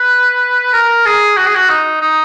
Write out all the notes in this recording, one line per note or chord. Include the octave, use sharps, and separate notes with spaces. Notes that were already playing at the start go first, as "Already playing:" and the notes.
Already playing: B4
A#4
G#4
F#4
G#4
F#4
D#4
D#4